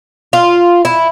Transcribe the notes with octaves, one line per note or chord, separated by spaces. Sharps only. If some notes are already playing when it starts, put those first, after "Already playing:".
F4
E4